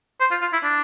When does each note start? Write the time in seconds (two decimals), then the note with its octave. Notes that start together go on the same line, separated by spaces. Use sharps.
0.20 C5
0.31 F4
0.42 F4
0.53 E4
0.64 D4